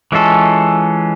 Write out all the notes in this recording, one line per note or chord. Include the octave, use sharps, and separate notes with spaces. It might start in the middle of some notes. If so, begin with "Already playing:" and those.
E3 G#3 C#4 F4 A4